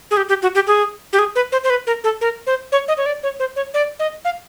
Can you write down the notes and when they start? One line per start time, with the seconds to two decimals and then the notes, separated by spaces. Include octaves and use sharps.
0.11 G#4
0.17 G4
0.29 G4
0.42 F#4
0.55 G4
0.67 G#4
1.13 G4
1.19 G#4
1.35 B4
1.52 C5
1.64 C5
1.70 B4
1.87 A#4
2.04 A4
2.21 A#4
2.47 C5
2.72 C#5
2.88 D#5
2.97 C#5
3.06 D5
3.23 C#5
3.40 C5
3.56 C#5
3.74 D5
3.99 D#5
4.25 F5